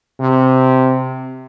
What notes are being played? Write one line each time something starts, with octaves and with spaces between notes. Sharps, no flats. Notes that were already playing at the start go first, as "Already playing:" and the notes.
C3